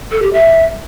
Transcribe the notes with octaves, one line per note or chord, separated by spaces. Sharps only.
A4
G4
E5